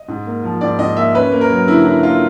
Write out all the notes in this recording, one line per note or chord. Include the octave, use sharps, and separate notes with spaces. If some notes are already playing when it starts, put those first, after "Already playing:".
Already playing: D#5
G#2
A#3
F3
G#2 D5
G#2 D#5
A#3 E5
C#4 B4
A#3
A#4
F#3
D3 E4
C#4 E4
A#3 F4